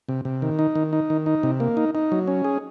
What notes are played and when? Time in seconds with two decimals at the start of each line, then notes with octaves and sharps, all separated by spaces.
0.09 C3
0.25 C3
0.42 D#3
0.59 D#4
0.75 D#3
0.93 D#4
1.10 D#3
1.26 D#4
1.43 C3
1.60 A#3
1.77 D#4
1.95 D#4
2.12 F#3
2.27 C#4
2.44 G#4